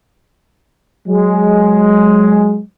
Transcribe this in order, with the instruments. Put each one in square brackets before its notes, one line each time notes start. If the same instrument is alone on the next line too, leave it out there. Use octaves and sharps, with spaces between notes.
[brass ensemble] F#3 G#3